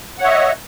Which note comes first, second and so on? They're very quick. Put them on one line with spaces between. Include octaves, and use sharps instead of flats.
F#5 C#5 E5 D#5